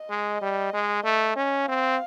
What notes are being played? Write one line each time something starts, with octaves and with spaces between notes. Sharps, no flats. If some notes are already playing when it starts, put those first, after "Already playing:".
Already playing: D#5
G#3
G3
G#3
A3
C#4
C4 F5